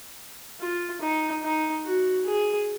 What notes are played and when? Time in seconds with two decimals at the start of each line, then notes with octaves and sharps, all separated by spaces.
0.61 F4
1.01 D#4
1.43 D#4
1.85 F#4
2.26 G#4